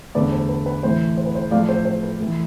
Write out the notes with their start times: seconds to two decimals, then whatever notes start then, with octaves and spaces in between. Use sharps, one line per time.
0.15 E2 D3 A3 B4 D5
0.32 C5
0.49 B4
0.66 B4
0.83 A2 E3 A3 C5
1.17 C5
1.26 B4
1.35 C5
1.51 A2 F3 A3 D5 F5
1.69 C5
1.85 C5
2.03 B4
2.20 E3 A3